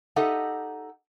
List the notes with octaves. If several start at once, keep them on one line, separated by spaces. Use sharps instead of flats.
D#4 G4 A4 D#5 E5 F#5